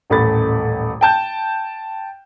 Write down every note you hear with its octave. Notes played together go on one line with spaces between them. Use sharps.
D#1 A1 A3 B5 A6
G5 A5 G6